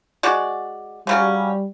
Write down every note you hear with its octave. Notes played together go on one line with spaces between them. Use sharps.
G#3 F#4 D5
C#3 F#3 G3 C#4